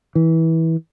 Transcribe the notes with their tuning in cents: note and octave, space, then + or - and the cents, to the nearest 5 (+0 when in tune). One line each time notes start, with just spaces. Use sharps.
E3 -20